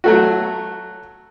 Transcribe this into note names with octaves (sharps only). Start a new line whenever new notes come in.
F#3 A3 F#4